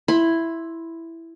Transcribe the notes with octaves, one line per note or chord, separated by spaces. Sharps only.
E4 B5 C6